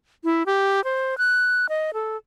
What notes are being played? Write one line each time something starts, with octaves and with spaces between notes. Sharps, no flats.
E4
G4
C5
F#6
D#5
A4